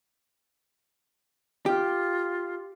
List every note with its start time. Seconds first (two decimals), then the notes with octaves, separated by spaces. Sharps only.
1.66 F4 G4